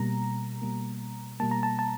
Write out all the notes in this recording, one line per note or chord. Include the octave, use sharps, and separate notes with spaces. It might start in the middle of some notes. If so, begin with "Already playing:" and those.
Already playing: B2 G3 A#3 A#5
B2 G3 A#3
B2 G3 A#3 A5
A#5
A5
A5